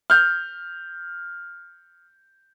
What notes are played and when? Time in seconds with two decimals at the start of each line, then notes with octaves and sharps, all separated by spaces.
0.10 F6 G6